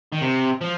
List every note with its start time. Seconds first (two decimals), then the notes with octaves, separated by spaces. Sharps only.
0.13 D#3
0.22 C3
0.61 F3